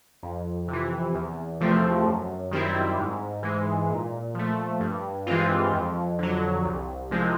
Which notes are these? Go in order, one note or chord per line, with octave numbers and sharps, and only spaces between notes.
F2
C3
E3
E2
C3 F3 A3 C4
F#2
D#3 G3 C4 E4
G#2
E3 G#3
A#2
F3 A3
G2
E3 G#3 C4 F4
F2
D3 F#3
C2
C3 F3 G#3 C4